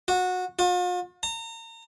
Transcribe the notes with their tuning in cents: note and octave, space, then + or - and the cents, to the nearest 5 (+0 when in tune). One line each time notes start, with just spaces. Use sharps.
F#4 -20
F4 +45
A#5 -35